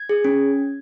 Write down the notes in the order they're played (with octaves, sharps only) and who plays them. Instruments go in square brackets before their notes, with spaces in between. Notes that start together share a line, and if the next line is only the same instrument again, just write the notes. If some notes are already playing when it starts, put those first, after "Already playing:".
Already playing: [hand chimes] G#6
G#4
C#4